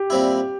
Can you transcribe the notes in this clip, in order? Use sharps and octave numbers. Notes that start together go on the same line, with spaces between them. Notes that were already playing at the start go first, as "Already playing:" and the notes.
Already playing: G4
A#2 G3 C4 E4